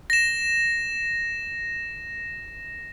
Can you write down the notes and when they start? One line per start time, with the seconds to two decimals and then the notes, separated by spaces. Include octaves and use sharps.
0.10 A#6 E7